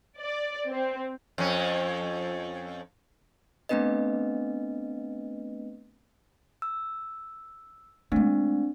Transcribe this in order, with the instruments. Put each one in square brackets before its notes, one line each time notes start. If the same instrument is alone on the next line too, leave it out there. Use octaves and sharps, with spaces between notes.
[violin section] D5
C4
[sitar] F2 C#4
[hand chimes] A3 B3 C4 D4 B4 D#5
E6
[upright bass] G#3 A3 [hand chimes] C4 D4